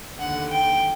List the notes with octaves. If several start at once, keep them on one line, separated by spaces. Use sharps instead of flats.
D#2 D3 F#5
G5